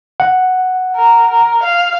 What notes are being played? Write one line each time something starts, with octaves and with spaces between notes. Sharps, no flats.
F#5
A#4
A#4
F5